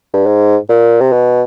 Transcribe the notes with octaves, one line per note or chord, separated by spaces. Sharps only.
G2
G#2
A#2
C3
B2